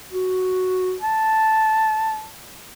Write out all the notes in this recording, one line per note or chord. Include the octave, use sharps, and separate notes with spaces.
F#4
A5